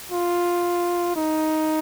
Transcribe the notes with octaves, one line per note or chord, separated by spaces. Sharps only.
F4
D#4